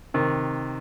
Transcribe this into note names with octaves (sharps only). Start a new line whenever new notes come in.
C3 D#3